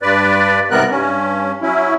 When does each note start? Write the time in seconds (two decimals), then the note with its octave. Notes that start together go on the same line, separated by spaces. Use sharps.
0.02 G2 B4 D5
0.71 G#2 C3 G3 B3 A#4 F#6
0.91 G2 C#4
1.62 F#3 C#4 E4